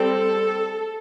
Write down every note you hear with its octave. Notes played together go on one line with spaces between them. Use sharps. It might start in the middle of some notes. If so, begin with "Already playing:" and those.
Already playing: G3 C4 A4